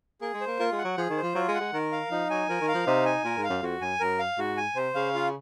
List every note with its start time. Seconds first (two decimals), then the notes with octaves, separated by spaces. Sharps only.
0.21 A#3 G#4
0.34 G#3
0.41 C5
0.47 A#3
0.59 A#3 F4
0.72 G#3
0.78 F#5
0.85 F#3
0.97 F3 G#4
1.10 D#3
1.17 C5
1.22 F3
1.35 F#3 F4
1.48 G#3
1.54 F#5
1.60 G#3
1.73 D#3 A#4
1.92 F5
2.11 F3 D#4
2.30 F#3 G#5
2.49 F3 A#4
2.61 D#3
2.68 F5
2.74 F3
2.87 C3 D#4
3.05 G#5
3.24 A#2 A#4
3.37 G#2
3.44 F5
3.50 F#2
3.62 F2 F#4
3.81 F#2 G#5
4.00 F#2 A#4
4.19 F5
4.38 G#2 F#4
4.57 G#5
4.76 C3 C5
4.95 C#3 F5
5.15 F4